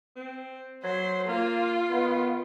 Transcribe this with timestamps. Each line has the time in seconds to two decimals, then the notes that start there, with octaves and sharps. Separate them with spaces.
0.16 C4
0.84 F#3 C5
1.29 A#3 F4
1.90 D#3 B3